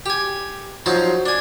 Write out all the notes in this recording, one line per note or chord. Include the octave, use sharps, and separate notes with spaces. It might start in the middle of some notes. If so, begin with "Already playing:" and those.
G4 G#5
F3 F#3 D#4 C5
D4 G#5